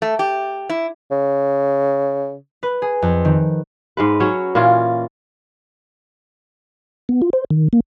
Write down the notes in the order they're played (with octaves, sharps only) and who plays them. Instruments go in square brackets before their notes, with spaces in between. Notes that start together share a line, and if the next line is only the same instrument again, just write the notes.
[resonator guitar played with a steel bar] A3
G4
E4
[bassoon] C#3
[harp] B4
G#4
F2
D#3
[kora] G#2 G#3 B4
F#3 C#4 C#5
A#2 E3 C#4 F4
[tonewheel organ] B3
F4
C5
D#3
A#3